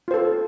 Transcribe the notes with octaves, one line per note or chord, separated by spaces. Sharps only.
F4 A4 C5